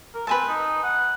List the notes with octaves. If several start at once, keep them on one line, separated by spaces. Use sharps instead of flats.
A#4
C4 B4 G#5 A5
D#4
F#5